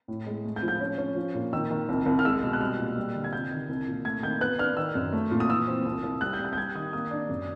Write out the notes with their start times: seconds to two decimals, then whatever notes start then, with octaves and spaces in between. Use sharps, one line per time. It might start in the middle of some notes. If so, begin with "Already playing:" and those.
0.08 A2
0.27 G#3
0.44 A3
0.56 G6
0.63 F3
0.68 G6
0.81 C#4
0.98 C#4
1.16 F3
1.34 A#2
1.53 D#3 E6
1.71 D#3
1.89 C2
2.06 C2
2.19 F6
2.25 G#3 E6
2.43 B2
2.53 F#6
2.61 G3 F6
2.79 A#2
2.97 G3
3.15 D3
3.24 G#6
3.33 C3 G6
3.51 D#3
3.69 C2
3.87 A#2
4.05 A3 G#6
4.23 D#3 G6
4.41 B3 F#6
4.58 D4 F6
4.77 D#3 E6
4.95 F#2
5.12 A3
5.31 A#2
5.40 D#6
5.50 E3 E6
5.68 C4
5.86 C2
6.03 C2
6.21 G3 F#6
6.33 G6
6.39 G3
6.45 F#6
6.53 G6
6.57 G3 G#6
6.75 D#3 D#6
6.93 A#3 D#6
7.11 D4
7.29 F#2